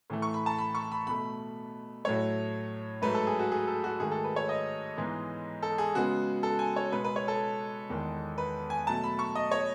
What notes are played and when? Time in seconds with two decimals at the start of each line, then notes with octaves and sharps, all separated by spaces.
0.10 A2 E3 A3
0.22 C#6
0.34 B5
0.46 A5
0.58 B5
0.75 C#6
0.92 B5
1.07 B2 A3 B5
2.05 A2 F#3 A3 C#5
3.02 G#2 F#3 A3 B4
3.15 A4
3.27 G#4
3.39 F#4
3.52 G#4
3.68 A4
3.84 F#4
3.99 G#2 D#3 A3 G#4
4.12 A4
4.24 B4
4.36 C#5
4.49 D#5
4.97 G#2 E3 G#3 B3
5.62 A4
5.78 G#4
5.95 C#3 G#3 B3 F#4
6.43 A4
6.59 G#5
6.76 C#5
6.92 B2 G#3 B3 B4
7.04 B4
7.16 C#5
7.28 A4
7.89 E2 D#3 G#3
8.38 B4
8.70 G#5
8.87 B2 F#3 A3 A5
9.04 B5
9.19 C#6
9.35 D#5
9.51 C#5